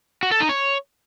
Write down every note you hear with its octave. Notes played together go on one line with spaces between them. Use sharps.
F#4
A4
D#4
C#5